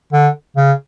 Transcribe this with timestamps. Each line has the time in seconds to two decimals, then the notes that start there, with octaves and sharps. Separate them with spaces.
0.13 D3
0.57 C#3